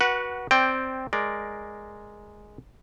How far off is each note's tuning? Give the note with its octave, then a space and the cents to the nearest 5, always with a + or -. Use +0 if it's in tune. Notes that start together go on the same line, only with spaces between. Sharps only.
F#4 +5 B4 -25 F#5 +0
C4 +0 D5 +0 G5 +0
G#3 +0 A#4 +5 D5 +0